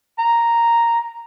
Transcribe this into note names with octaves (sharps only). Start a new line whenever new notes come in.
A#5